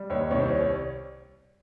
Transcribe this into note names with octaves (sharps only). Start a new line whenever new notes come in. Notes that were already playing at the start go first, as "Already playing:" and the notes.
Already playing: G3
D#2 C#5
C2 C#5
C5
G3 C#5
C#5